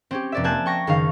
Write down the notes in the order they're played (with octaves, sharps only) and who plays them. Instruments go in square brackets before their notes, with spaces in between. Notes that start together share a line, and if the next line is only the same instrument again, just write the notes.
[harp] C4 C#4 G4
F1 D5 E5
A#3 G#5 A5 F#6 G6 E7
G5 C#6 A#6
F#1 D#3 D#4 F5